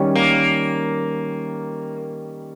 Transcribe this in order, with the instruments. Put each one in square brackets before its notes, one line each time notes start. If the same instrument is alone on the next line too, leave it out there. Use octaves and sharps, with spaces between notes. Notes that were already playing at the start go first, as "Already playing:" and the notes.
Already playing: [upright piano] D#3 G3 C#4
[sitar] A#3